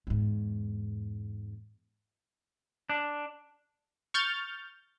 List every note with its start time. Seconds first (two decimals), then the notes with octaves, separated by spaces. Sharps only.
0.07 E2 G#2
2.90 D4
4.14 C#6 F6 G6 A6